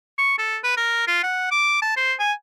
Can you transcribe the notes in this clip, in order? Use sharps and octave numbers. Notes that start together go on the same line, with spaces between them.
C#6
A4
B4
A#4
F4
F#5
D6
A5
C5
G#5